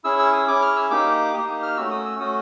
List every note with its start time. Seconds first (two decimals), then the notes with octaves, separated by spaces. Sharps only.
0.04 C#4 E4 G#4 E6
0.19 E6
0.33 D#6
0.48 C#4 E4 G#4 D6
0.62 F6
0.76 E6
0.91 A#3 D#4 G4 D6
1.34 A#3 D#4 G4 D#6
1.63 F6
1.77 A3 C#4 F#4 E6
1.91 D#6
2.05 E6
2.20 A3 C#4 F#4 D#6